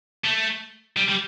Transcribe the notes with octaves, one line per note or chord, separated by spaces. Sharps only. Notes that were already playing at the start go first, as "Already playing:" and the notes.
A3
G3
G3